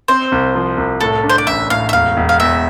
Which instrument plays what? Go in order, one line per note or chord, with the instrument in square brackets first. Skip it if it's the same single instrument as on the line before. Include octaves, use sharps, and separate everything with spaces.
[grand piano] C4 [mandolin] C5
[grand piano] C2
F3
C2
[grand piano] A2 [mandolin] A4
[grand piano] D4
[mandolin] C5
D5
[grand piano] A1 [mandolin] E5
[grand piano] A2 [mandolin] F5
[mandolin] E5
[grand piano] E1 [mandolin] F5
[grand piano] E1
[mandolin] F5
[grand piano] E2 [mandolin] E5